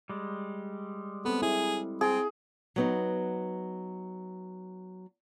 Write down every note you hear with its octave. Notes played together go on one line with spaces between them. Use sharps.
G3 G#3
B3 C4 A4
E4 G#4
C4 G#4
F#3 B3 D#4